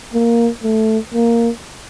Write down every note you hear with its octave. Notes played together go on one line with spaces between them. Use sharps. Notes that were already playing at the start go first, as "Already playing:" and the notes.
A#3
A3
A#3